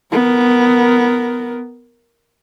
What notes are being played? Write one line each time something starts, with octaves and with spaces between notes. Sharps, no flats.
B3 A#4